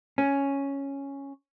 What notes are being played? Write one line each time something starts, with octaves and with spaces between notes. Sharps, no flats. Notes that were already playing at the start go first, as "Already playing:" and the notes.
C#4